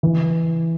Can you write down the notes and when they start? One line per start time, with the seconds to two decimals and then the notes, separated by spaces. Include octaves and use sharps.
0.03 E3